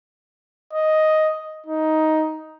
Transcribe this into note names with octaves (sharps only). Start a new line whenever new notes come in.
D#5
D#4